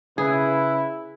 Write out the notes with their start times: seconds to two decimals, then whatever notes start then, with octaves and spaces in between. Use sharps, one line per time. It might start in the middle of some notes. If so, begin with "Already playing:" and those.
0.18 C#3 E4 G#4 B4